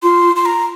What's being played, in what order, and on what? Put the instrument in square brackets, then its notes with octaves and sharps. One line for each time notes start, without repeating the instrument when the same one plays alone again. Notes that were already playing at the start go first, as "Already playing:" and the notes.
[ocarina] F4 [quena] C6
[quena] C6
A#5